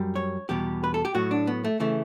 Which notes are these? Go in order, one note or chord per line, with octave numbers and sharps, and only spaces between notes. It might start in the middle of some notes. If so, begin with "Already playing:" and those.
Already playing: F#2 G3
C#5
E2 B2 G3 G4
B4
A4
G4
A2 F#3 F#4
D4
B3
A3
C#3 E3 A3